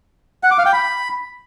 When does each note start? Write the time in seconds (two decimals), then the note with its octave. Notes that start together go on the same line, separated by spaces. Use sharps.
0.43 F#5
0.51 D6
0.58 F5
0.66 G5
0.73 B5